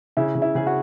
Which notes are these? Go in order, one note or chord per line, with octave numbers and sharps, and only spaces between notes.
C#3 E4
C#3
E4
C#3 G#4
F#4